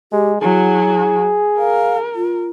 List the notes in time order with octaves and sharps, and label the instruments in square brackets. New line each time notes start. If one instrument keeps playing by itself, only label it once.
[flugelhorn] G#3 [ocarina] G4
[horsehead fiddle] F#3 F#4 [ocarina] E4 [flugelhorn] G#4
[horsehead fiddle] A#4 [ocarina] F5
[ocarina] F4